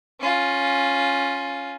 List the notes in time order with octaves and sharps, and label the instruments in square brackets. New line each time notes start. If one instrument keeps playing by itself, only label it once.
[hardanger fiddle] C#4 F4